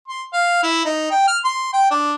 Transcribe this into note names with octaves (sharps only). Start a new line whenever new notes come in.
C6
F5
E4
D#4
G5
F6
C6
G5
D4